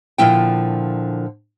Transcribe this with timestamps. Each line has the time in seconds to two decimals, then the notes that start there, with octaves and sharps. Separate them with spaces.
0.18 A#2 D3 F3 E4 G5